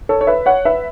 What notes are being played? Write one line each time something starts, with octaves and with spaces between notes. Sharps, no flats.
A4 C#5
C#5
B4 E5
C#5 F#5
B4 E5